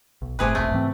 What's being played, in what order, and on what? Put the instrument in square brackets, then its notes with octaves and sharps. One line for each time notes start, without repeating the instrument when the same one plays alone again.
[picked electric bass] B1
[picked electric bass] G1 A2 [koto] C3 G#4 B4
[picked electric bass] E1 B1 [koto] A3
[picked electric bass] G#2 E3 C4